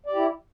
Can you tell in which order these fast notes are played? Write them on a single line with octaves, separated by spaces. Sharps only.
D5 G4 E4